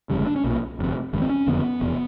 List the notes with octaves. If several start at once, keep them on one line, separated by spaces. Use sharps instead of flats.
G1 F2 C#3 G3
G#3
D4
C#4
B1 A#2
G1 F2 C3
A1 G2 D3
C4
C#4
F#1 F2 D3 B3
F1 E2 B2